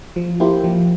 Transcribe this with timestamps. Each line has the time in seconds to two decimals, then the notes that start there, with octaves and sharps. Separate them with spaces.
0.16 F3
0.40 A#3 E4 G4 C5
0.64 F3